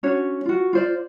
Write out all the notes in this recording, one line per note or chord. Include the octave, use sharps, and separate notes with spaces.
C#4 D4 F#4 C#5
F4 F#4
F4 C5 D5